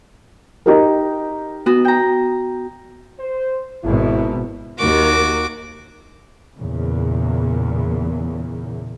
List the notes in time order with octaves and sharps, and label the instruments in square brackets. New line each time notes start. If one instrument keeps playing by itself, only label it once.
[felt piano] D#4 G4 A#4
[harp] B3 F#4
G5 A#5
[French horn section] C5
[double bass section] G#1 B2 [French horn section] E4
[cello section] D#2 A#4 [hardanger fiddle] F#4 D6
[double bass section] E2 A#2 C#3